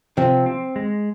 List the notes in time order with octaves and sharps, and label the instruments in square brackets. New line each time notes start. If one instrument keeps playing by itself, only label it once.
[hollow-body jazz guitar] C3 C4 [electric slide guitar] F3
[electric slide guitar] C4
G#3